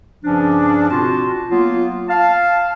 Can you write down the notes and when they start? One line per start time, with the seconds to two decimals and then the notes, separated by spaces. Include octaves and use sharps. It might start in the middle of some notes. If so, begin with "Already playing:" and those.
0.24 G2 C#3 F3 C#4 D4
0.91 B2 C4 F4 F#4 A5 C6
1.50 F#3 A#3 B3 F4
2.09 F5 A5